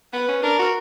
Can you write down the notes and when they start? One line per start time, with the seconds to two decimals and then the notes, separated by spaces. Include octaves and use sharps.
0.13 B3 B4
0.28 C#4
0.43 D4 A#4
0.59 F#4